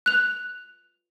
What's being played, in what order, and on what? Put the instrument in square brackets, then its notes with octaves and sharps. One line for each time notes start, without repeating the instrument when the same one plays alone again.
[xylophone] F#6 F7